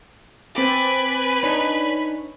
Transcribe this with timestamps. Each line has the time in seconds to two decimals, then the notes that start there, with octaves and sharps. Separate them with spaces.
0.55 C4 B4 G#5 D6 A6
1.43 D4 D#4 C#5